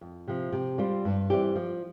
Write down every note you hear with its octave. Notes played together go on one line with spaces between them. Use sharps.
F2
C3 F3
C3
G3 C4 F4 C5
G2
E3 G3 C4 G4
F3